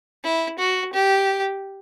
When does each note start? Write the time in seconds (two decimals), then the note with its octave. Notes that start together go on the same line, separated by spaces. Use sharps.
0.24 E4
0.59 F#4
0.93 G4